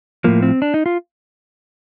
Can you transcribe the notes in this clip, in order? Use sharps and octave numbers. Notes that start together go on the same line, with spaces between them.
A2 F3 A#3
C4
D4
D#4
F4